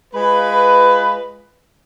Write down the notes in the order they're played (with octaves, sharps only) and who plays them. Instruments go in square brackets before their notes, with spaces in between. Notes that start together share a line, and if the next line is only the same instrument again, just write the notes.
[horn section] G#3 F4 B4